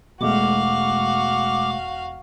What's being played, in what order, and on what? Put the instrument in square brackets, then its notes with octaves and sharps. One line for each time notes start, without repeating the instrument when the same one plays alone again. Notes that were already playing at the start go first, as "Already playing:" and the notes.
[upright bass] E1 [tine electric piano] B2 G#3 A3 [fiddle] F#4 F5 [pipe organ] D6